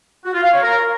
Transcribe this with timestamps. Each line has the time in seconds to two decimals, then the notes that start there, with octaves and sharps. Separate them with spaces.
0.25 F#4
0.34 F4
0.43 F5
0.52 C#5
0.62 A#4